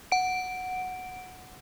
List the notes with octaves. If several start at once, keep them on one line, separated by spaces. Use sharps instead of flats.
F#5 D7